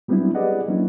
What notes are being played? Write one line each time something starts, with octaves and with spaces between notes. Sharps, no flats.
F#3 G3 B3 C4 D4 E4
G4 G#4 B4 D5 D#5 F#5
F#3 A#3 C#4 D4 E4